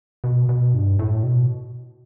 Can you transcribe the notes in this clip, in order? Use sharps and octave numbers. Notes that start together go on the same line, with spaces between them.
B2
B2
G2
A2
B2